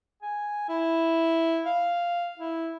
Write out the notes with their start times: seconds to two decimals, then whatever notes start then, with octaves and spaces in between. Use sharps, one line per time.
0.22 G#5
0.69 E4
1.66 F5
2.39 E4